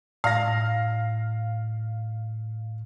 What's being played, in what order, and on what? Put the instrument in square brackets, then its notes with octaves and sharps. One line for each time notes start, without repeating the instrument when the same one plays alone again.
[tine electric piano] A2 [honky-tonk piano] F5 A#6